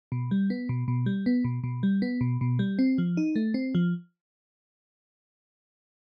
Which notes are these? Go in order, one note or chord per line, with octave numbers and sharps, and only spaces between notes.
B2
G3
B3
B2
B2
G3
B3
B2
B2
G3
B3
B2
B2
G3
C4
F3
D#4
A3
C4
F3